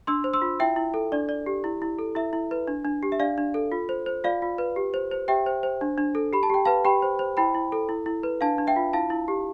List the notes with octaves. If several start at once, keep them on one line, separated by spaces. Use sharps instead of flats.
D4 C6 E6
C5
C6 E6
F4
E4 E5 G5
E4
A4
D4 D5
D5
G4
E4
E4
A4
E4 E5
E4
B4
D4
D4
G4
E5
D4 D5 F5
D4
A4
F4
C5
C5
F4 D5 F5
F4
B4
G4
C5
C5
G4 E5 G5
C5
C5
D4
D4
A4
G4 B5
A5
G4 G5
B4 F5 A5
G4 G5 B5
C5
C5
E4 G5 B5
E4
A4
E4
E4
B4
D4 F5 A5
D4
E5 G5
F4
E4 F5 A5
E4
G4